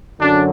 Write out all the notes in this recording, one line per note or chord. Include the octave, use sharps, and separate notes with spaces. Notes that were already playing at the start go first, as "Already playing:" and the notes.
F#2 D3 F#3 D4